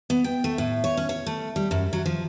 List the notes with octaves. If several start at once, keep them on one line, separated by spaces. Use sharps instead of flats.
B3
G5
A3
A2
C#5
C#4
C#5
A3
G3
F#2
F#3
F3